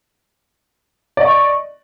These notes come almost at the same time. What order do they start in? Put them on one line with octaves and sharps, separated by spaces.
D5 D#5 C#6